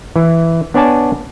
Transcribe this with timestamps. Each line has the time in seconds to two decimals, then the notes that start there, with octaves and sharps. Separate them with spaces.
0.16 E3
0.74 B3 D4 C#5 D5 G#5 A5